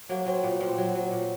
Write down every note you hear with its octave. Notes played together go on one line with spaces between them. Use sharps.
F#3 A#3
F#3 C4
A#2 B3
A#2 C4
F#3
F#3
A#2